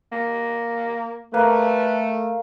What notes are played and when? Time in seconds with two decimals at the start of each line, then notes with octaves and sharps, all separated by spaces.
0.12 A#3
1.34 A3 A#3 B4